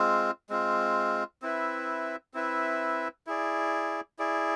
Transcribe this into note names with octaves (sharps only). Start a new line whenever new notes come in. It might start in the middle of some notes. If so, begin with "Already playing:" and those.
Already playing: G#3 C4 F4
G#3 C4 F4
C4 E4 B4 E5
C4 E4 B4 E5
E4 G#4 D5
E4 G#4 D5